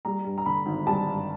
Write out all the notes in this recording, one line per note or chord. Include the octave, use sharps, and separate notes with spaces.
G3 A#5
G2
A#5
D3 B5
G#1
G3 A5
G2